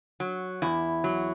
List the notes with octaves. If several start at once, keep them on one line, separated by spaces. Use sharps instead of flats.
F#3
E2 E4
F#3